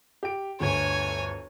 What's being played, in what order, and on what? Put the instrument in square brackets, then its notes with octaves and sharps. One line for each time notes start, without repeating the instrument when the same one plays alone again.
[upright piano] G4 D7
[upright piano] G1 D2 [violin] C#5 G#5